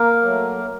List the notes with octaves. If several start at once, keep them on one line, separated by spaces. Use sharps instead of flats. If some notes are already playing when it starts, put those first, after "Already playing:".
Already playing: A#3 A#4
F#3 A3